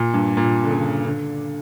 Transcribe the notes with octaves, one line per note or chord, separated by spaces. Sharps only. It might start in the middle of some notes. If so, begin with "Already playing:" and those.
Already playing: A#2
G2
A#2
D3
C#3
D3